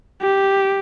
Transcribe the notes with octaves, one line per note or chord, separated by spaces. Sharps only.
G4